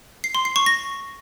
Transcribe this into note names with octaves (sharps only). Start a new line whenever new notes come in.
C7
C6
C7
C#6
A#6